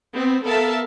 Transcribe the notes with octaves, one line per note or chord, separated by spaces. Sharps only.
B3 C4
B3 A4 A#4 E5 F5 A5